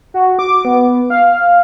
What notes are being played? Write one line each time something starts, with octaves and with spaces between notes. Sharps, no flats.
F#4
D6
B3
F5